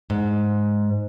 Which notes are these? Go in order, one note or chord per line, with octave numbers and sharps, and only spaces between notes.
G#2